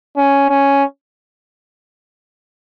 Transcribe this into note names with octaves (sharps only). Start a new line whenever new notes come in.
C#4
C#4